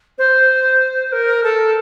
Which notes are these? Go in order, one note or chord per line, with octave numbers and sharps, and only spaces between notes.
C5
A#4
A4